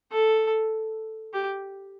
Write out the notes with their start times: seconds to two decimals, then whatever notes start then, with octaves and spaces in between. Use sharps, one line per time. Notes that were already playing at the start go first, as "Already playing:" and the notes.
0.12 A4
1.33 G4